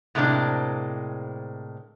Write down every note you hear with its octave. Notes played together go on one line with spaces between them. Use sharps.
A2 C3 G#3 A#3 C4 D4